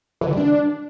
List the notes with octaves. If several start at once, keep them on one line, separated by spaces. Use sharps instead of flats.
E3
D3
G3
D4